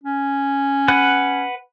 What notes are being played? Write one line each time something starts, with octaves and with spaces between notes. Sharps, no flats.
C#4
B4 F#5